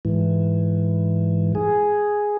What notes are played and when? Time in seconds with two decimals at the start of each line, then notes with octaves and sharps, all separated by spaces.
0.05 G#2 E3
1.55 G#4